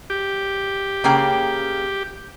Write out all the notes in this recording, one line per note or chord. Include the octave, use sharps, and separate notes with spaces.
G4
C#3 A#3 G5